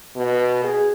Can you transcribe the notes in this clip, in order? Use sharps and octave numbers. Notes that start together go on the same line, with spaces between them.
B2
G#4